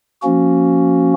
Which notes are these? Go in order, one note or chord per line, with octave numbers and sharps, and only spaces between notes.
F3 A#3 C#4 F#4